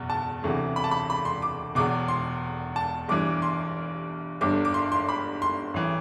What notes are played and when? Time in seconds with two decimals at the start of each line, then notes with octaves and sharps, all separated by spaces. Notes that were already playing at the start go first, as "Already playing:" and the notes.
Already playing: F#1 E2 B2
0.10 A5
0.42 E1 D2 C3 E3
0.76 B5
0.84 A5
0.91 B5
1.10 B5
1.25 C6
1.42 D6
1.75 E1 E2 B2 D6
2.08 C6
2.76 A5
3.08 G1 G2 E3 D6
3.42 C6
4.41 G1 G2 D3 D6
4.65 D6
4.74 C6
4.92 C6
5.09 B5
5.42 C6
5.74 A1 E3